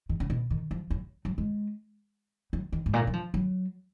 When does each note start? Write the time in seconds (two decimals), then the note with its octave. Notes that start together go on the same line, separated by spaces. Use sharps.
0.09 D#3
0.20 C#3
0.30 B2
0.50 D#3
0.71 F3
0.90 F#3
1.25 F#3
1.38 G#3
2.53 F#3
2.72 D#3
2.86 G#2
2.93 A#2
3.07 F#3
3.13 F3
3.34 F#3